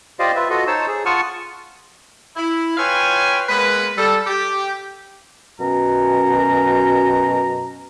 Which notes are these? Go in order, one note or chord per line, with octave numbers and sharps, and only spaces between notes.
F4 G4 C5 D5 D#5 F5
F4 B4 E5
F4 F#4 A4 D#5
D#4 C5 C#5 A5 E6
G#4
F4 F#5 A5 C#6 D#6 F6
E4
F4 B4 C#5 F5 G5 G#5
G#3 A#3 B3 B4
G3 A4
G4
F#2 B2 C#4 A#5